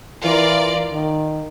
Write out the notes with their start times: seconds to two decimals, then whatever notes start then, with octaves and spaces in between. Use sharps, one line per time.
0.24 E3 F4 A#4 D5
0.93 D#3